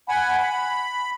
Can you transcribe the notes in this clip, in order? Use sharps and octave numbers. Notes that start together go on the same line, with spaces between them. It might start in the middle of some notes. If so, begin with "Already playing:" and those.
F#5 G#5 B5
B5